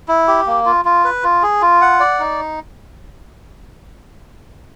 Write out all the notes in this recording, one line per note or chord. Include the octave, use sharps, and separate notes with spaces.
E4
G4
A#3
F4
F4
B4
F4
G#4
F4
F#5
D5
D#4